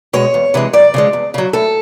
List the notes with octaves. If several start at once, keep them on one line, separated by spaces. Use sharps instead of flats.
B2 G#3 C#5
E2
C3 E3 G#3
F#2 D5
C#3 F3 G#3
E2
C#3 F#3
A2 A4